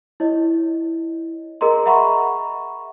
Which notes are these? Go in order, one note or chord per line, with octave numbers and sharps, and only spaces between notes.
E4 C#5 D#5
G#4 A#4 D#5 A#5 C6
E5 F#5 A#5 B5 C#6